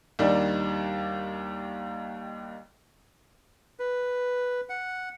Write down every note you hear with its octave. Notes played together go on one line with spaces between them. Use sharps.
D#2 D#3 G3 D4
B4
F#5